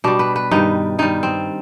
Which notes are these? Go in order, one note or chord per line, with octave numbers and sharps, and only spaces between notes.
B2 G3 D4
B4
B4
G2 D#3 G3 D#4
G2 D#3 G3 D#4
C4